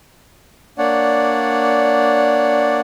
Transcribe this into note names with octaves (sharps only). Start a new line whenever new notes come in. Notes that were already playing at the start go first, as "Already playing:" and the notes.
A#3 D4 C#5 D5 F#5